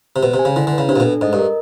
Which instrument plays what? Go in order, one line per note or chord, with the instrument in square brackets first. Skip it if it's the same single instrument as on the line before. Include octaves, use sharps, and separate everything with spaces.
[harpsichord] C3
[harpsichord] B2 [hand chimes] C5
[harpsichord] C3
[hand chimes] G#5
[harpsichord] C#3
[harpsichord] D3 [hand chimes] E4
[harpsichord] D3
[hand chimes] B4
[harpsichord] C#3
[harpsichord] C3 [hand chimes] D4
[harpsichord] A#2
B2
[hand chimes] A4
[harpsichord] G#2 [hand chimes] D#5
[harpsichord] G2
[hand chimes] A#4